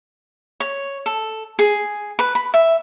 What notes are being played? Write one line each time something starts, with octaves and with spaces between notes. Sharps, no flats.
C#5
A4
G#4
B4
B5
E5